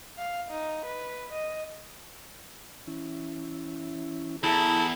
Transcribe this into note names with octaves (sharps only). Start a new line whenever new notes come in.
F5
D#4
B4
D#5
E3 C#4 E4
E2 E4 G#4 A4 A#5